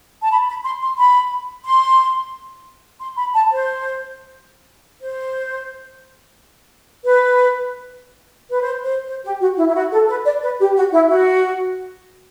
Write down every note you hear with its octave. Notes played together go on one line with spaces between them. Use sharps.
A5
B5
B5
C6
C6
B5
C6
C6
B5
A5
C5
C5
B4
B4
C5
C5
C5
G4
F#4
E4
E4
F#4
A4
B4
D5
B4
G4
F#4
E4
F#4